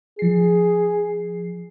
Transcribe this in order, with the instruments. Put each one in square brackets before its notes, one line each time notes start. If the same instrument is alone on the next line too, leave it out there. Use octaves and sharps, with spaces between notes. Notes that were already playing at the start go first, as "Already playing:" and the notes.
[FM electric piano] F3 C7 [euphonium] G#4